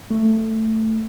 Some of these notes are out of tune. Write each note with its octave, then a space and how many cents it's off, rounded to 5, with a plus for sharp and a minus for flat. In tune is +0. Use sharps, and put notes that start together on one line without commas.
A3 +10